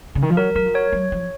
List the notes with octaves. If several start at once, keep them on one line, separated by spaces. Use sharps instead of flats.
C#3
D#3
F3
F#3 A#4
F#3 A#4
F3
F#3 C#5
F#3
F3